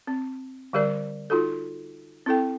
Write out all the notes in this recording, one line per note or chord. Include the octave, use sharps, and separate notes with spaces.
C4
D3 G3 G4 A#4 D5
D#4 F4 F#4 A4
C4 E4 A4 G5